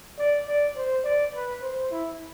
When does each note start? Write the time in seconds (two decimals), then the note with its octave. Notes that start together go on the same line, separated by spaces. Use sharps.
0.19 D5
0.48 D5
0.77 C5
1.05 D5
1.35 B4
1.63 C5
1.92 E4